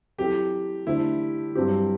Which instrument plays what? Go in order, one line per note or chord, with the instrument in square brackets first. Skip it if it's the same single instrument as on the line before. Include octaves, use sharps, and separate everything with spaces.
[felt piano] F#3 C4 E4 A4 [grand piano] G4
[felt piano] D3 A3 D4 G4 C5 [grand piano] E4
[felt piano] G2 F#3 C4 G4